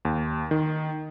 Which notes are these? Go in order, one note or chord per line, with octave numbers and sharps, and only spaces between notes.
D#2
D#3